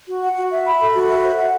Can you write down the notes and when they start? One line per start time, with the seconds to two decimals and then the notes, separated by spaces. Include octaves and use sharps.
0.08 F#4
0.22 F#5
0.37 F#4
0.51 E5
0.66 B5
0.80 A4
0.94 F#4
1.09 E5
1.22 C5
1.37 F#5